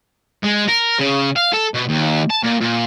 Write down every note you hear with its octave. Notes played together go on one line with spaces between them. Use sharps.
G#3
A#4
C#3
F5
A4
B2
D#2
A5
A#2
A#2